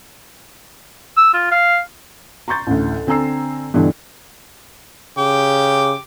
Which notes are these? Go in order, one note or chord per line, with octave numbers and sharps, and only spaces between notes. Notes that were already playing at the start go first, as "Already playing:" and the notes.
E6
F4
F5
A#5 C6 C#6 G6 A6
A1 D2
D3 C4 G#5 A#5 E6 C7
G2 B2 D3 E3 D4
C#3 G4 D6